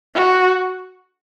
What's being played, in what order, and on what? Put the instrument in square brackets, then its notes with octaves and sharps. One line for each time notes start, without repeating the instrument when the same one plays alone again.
[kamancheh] F#4